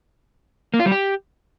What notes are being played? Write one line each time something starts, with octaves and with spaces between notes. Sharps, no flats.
A#3
F4
G3
G4